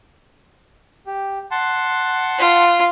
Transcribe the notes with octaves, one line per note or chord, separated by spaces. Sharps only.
G4
F#5 A5 C6
F4